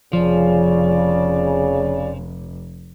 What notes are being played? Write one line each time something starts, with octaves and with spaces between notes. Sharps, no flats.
F1 C#3 F3 D5